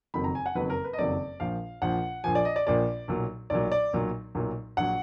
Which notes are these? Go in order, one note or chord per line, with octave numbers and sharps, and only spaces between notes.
F#1 F2 D#3 F#3 B5
A#5
G#5
F#5
F#1 F2 D#3 F#3 B4
A#4
B4
D#5
F#1 F2 D#3 F#3 D5
A#1 A#2 F3 F5
A#1 A#2 F3 F#5
A#1 A#2 F3 G#5
D5
D#5
D5
A#1 A#2 F3 D5
B1 A#2 F#3
B1 A#2 F#3 D5
D5
B1 A#2 F#3
B1 A#2 F#3
A#1 F#3 F#5